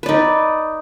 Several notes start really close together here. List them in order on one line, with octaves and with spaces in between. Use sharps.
B4 D5 D#4